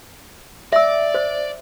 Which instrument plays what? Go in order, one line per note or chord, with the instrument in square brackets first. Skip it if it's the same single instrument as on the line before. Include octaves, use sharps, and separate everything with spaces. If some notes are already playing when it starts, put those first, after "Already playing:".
[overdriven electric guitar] D5 [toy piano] E5 E6
[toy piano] C5